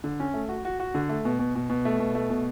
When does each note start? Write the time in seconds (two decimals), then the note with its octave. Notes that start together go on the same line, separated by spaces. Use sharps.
0.04 D3
0.20 C#4
0.34 A3
0.49 F#4
0.65 F#4
0.80 F#4
0.94 D3
1.09 A3
1.25 B2
1.39 B2
1.55 B2
1.70 B2
1.85 A3
1.99 B2
2.15 A3
2.30 B2